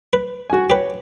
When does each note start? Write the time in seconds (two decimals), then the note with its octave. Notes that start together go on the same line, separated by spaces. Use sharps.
0.13 B4
0.50 F#4 G#5
0.70 G4 B4 C#5